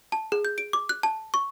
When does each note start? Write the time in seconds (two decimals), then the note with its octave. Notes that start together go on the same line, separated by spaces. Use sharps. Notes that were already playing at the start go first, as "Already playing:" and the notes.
0.12 A5
0.32 G#4
0.45 G6
0.58 D7
0.73 D6
0.89 F#6
1.03 A5
1.34 C#6